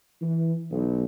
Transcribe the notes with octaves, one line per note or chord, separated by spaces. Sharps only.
E3
B1